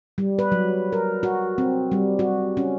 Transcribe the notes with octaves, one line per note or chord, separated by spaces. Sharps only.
G3
B4
F#3
A#4
F#4
C4
G3
F#4
C#4